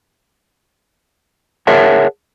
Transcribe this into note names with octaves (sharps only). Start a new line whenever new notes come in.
G#4 A#4 C#5 E5 F#5 A5